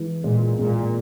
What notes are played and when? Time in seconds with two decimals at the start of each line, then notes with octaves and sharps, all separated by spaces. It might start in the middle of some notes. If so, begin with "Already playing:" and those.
Already playing: E3 G#3
0.24 A#2 G#3
0.59 A#2 G#3